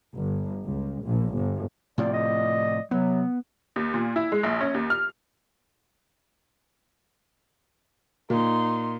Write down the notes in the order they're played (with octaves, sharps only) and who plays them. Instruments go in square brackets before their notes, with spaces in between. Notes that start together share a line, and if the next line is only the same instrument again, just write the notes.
[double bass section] G1
C#2
A#1
G1
[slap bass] A2 C3 F3 [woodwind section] D5
[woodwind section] D5 D#5
[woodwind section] C3 F#3 [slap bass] B3
[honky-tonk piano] D#2
A#2
E4
G#3
A#1
C#4
D#2
F6
[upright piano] A#2 [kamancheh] D#4 C6